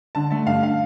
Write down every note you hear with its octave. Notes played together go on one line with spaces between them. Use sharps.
D3 A5
A3 A5
G2 F5
F5